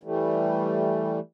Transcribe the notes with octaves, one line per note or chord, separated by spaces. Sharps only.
E3 G3 A3